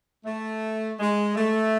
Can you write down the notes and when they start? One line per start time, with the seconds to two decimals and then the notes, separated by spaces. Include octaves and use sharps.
0.25 A3
0.99 G#3
1.36 A3